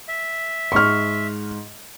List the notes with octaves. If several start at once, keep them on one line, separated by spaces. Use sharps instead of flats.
E5
G#2 C6 C#6 F6